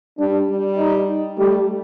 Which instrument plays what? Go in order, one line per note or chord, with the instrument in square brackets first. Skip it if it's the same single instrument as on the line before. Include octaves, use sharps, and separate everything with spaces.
[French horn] G3 [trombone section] D4
[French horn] G3
[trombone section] D#4
[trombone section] G3 [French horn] A3